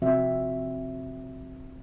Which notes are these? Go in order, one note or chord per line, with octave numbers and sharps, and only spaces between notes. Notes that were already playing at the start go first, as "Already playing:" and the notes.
C3 F3 C4 F#4 E5